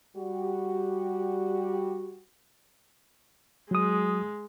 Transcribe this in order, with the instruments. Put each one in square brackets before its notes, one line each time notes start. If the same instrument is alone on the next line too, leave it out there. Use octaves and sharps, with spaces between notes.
[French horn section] G3 F#4 G4
[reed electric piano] F#3 D#6 [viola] G#3